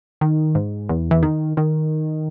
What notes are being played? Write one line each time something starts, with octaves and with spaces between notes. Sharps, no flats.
D#3
G#2
E2
E3
D#3
D#3